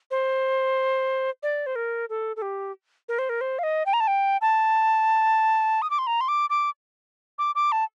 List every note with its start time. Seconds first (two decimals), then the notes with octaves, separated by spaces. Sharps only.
0.11 C5
1.43 D5
1.66 C5
1.75 A#4
2.10 A4
2.36 A4
2.42 G4
3.09 A#4
3.19 C5
3.29 A#4
3.41 C5
3.59 F5
3.63 D#5
3.86 G5
3.93 A#5
4.00 A5
4.07 G5
4.41 A5
5.82 D#6
5.90 D6
5.98 C6
6.07 A#5
6.21 C6
6.28 D6
6.50 D6
7.39 D6
7.55 D6
7.72 A5